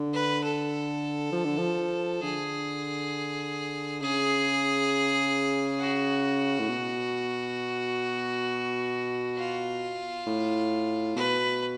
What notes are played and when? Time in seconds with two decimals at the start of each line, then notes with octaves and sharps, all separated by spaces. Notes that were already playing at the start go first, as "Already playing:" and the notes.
Already playing: D3
0.13 B4
0.44 A4
1.32 F3
1.45 D3
1.58 F3
2.22 D3 G#4
4.01 C#3 G#4
5.80 F#4
6.60 A2
6.69 B2
9.38 F4
10.27 A2
11.16 B2 B4